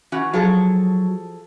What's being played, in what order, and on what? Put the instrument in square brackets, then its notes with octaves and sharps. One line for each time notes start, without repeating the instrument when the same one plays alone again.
[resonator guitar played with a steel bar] E3 C#4 F#4
[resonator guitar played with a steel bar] F3 G#4 A4 [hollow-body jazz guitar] F#3